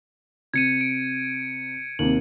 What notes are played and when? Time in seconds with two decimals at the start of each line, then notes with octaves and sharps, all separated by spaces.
0.54 C3 G#6 C#7 D#7
0.81 D7
1.99 D#2 C3 F#7